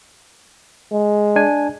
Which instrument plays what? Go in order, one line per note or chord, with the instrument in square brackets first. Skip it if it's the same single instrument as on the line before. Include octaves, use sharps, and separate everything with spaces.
[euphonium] G#3
[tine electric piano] D4 G#5